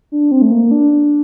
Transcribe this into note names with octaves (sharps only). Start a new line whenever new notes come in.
D4
C4
A3
A#3
D4